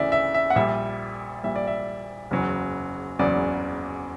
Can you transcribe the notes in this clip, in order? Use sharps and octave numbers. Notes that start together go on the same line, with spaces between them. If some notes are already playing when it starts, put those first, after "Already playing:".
Already playing: D2 C#3 E3 D5 E5
E5
E5
F#5
A#1 A#2 G3 E5
A#1 A#2 G3 E5
D5
E5
F#1 E2 C#3 F#3
F#1 E2 C#3 F#3 D5